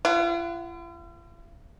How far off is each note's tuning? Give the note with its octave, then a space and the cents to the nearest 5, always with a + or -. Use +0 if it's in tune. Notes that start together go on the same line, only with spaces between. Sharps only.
F4 -45 F#5 +0